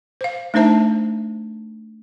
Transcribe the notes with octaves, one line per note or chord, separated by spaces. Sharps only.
C5 F5
A3 D4 D#4 C5 E5 A5